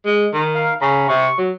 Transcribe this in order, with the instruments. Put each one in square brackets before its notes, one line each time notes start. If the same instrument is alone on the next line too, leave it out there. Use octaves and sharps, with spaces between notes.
[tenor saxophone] G#3
D#3
[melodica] A#4 F5
[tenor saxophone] C#3 [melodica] C#4 A#5 B5
[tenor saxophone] C3 [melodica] C#6
[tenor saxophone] F#3